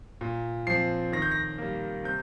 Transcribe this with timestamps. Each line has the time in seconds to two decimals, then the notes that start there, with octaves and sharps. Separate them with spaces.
0.21 A#2
0.67 F3 C4 C7
1.12 D#3 A#6
1.22 G6
1.31 A#6
1.58 G3 A#3
2.04 C3 G6